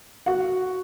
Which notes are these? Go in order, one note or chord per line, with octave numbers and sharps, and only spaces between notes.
F#4 F#5